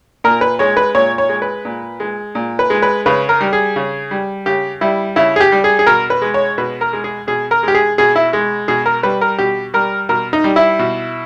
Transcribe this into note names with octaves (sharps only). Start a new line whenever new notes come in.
A#2 A#4
B4
G#3 C#5
B4
A#2 C#5
C#5
G#3
B4
A#2
G#3
A#2
B4
G#3
B4
C#3 B4
A#4
G3
G#4
C#3
G3
C#3 G4
G3 E4
C#3 E4
G#4
G4
G3
G#4
G#4
B2 A#4
B4
G#3
C#5
B2 B4
A#4
G#3
G#4
B2 G#4
A#4
G#3 G4
G#4
B2 G#4
E4
G#3
B2 G#4
A#4
G3 B4
A#4
B2 G4
G3 A#4
B2 A#4
D#4
G3
E4
B2